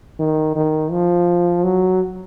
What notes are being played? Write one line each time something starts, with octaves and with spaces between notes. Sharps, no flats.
D#3
D#3
F3
F#3